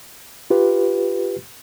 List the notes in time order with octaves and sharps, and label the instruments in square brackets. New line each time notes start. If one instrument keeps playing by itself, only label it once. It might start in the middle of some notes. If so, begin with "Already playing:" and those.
[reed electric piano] F4 G4 B4